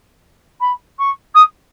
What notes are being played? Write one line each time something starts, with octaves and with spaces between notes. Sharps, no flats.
B5
C#6
D#6